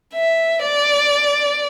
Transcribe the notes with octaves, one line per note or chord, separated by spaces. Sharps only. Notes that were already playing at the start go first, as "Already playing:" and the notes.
E5
D5